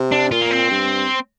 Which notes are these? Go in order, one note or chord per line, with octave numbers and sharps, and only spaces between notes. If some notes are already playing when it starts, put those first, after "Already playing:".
Already playing: C3
D4
A#2 F4
A#3
C4
G2